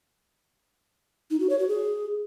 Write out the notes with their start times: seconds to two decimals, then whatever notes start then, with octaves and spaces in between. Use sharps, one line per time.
1.31 D#4
1.40 F#4
1.50 C#5
1.59 F#4
1.69 G#4